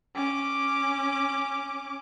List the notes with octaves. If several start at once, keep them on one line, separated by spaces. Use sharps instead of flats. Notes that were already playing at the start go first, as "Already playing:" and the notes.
C#4 D6